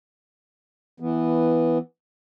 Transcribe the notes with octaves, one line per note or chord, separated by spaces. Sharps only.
E3 B3